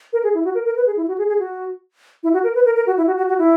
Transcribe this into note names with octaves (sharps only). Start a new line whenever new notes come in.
A#4
G#4
E4
F#4
A#4
A#4
B4
G#4
E4
F#4
G#4
G#4
F#4
E4
F#4
A#4
B4
A#4
A#4
F#4
E4
F#4
F#4
F#4
E4